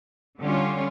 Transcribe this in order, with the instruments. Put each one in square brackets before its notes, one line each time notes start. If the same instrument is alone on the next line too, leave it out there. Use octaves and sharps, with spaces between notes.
[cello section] D3 G3 C#4 F4